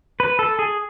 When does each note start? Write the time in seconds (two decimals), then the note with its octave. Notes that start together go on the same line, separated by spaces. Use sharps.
0.20 B4
0.39 A4
0.59 G#4